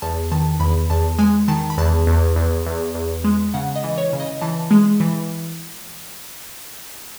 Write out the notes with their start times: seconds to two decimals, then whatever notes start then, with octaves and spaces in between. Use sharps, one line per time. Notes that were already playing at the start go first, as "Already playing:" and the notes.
0.02 E2 A5
0.32 D#3 A5
0.60 E2 B5
0.90 E2 A5
1.19 G#3 G#5
1.48 D#3 A5
1.70 B5
1.78 E2 A5
2.07 E2
2.36 E2
2.67 E2
2.95 E2
3.24 G#3
3.54 C#3 F#5
3.76 D#5
3.84 E3
3.98 C#5
4.13 C#3
4.20 D#5
4.42 E3 A5
4.71 G#3
5.00 E3